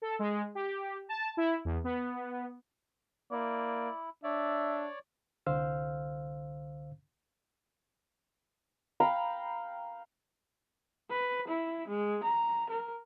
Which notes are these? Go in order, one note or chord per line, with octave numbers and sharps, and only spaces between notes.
A4
G#3
G4
A5
E4
E2
B3
A#3 E4 D5
D4 C#5 D5 E5
C2 D3 C5 F5 E6 F6
F5 G5 A#5 B5
B4
E4
G#3
A#5
A#4